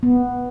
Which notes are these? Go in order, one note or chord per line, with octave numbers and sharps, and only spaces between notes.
B3